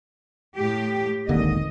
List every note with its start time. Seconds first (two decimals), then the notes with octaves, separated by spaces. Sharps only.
0.56 A2 G4
1.29 D#1 G#1 D3 A#3 D#5